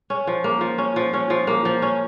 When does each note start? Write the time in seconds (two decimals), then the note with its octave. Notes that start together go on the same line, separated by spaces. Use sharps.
0.10 C#4
0.27 F3
0.44 A#3
0.61 F3
0.78 C#4
0.96 F3
1.13 C#4
1.30 F3
1.47 A#3
1.65 F3
1.82 C#4